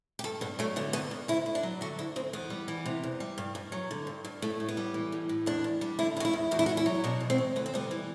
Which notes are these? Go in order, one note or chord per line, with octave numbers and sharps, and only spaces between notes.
G4
G2 A4
G2 B3
F#3 A3
D3 B3
G2 B3
G2
D2 E4
D2
D4
F#3
D3 F#4
D2 E4
D2 C4
E2 B3
G3
E3
C3
E2
G3
G2
G2
F#3
D3
G2
G2
A2 A3
A2
B3
G3
E3
A2
A2
E2 D4
E2
G3
D3 E4
E2 F#4
E4
E2
E2 F#4
E4
F#4
E2
E4
F#3
B2 D4
E2
C4
E2
D2 B3
C4
G3 B3
E3